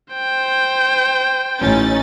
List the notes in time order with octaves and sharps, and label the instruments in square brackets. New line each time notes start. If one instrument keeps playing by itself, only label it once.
[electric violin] C5 G5
[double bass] A1 [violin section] C#4 D#4 A6